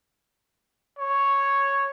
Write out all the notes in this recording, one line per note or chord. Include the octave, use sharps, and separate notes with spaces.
C#5